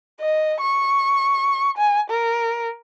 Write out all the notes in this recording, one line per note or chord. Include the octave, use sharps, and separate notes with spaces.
D#5
C#6
G#5
A#4